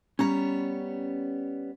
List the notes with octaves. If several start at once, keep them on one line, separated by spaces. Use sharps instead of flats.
G3 B3 C#4 C#5 A#5